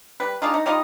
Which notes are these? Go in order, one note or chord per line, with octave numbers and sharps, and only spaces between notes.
G3 B4
G#3 D4 D#4 F4
D#4 A#5
G3 D#4 F4 D#5